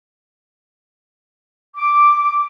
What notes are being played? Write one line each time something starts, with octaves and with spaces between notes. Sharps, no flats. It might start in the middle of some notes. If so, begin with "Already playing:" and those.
D6